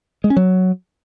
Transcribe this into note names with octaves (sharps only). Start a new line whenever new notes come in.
G#3
C#4
F#3